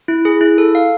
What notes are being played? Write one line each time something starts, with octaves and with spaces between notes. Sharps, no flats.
E4
G#4
E4
A4
F5